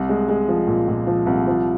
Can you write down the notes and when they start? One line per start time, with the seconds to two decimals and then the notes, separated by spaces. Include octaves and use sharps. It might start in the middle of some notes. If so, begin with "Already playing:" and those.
Already playing: C2
0.09 G#3
0.29 G#3
0.49 F3
0.68 A#2
0.88 A#2
1.07 F3
1.27 C2
1.47 F3